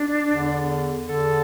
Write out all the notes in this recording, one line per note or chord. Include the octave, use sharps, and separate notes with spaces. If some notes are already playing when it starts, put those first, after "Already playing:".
Already playing: D4
E2 D3
E2 D3 A4